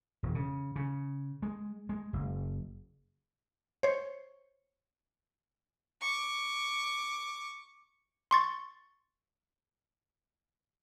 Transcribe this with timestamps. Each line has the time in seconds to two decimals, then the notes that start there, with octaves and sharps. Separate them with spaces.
0.23 E1
0.35 C#3
0.76 C#3
1.42 G#3
1.89 G#3
2.13 F#1
3.83 C5 C#5
6.01 C#6 D6
8.31 C6 C#6 A6